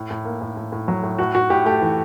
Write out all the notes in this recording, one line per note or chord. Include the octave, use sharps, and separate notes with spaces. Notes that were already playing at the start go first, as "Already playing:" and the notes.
Already playing: A2
A2
A#3
A2
A2
A2
F#3
A2
A2 F#4
A2 F#4
A2 G4
A3 G4
E3